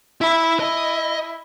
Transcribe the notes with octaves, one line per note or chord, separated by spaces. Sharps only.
E4 E5 B5
E4 D#5